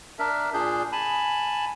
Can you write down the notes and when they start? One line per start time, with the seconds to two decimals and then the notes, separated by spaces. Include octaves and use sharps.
0.19 D4 A#4 E5
0.54 A#2 D4 G#4 G6
0.92 G#5 A5 B5